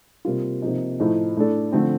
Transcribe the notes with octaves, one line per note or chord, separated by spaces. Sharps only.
C3 G3 A#3 F4
C3 F3 A#3 D#4
A2 F3 A3 D#4
A2 A3 D4 A4
D3 F3 A3 C4